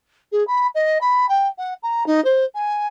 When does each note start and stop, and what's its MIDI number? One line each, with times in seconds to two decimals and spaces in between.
0.32 0.46 68
0.47 0.67 83
0.75 0.98 75
1.01 1.29 83
1.29 1.47 79
1.58 1.74 78
1.83 2.06 82
2.06 2.23 63
2.24 2.44 72
2.55 2.87 80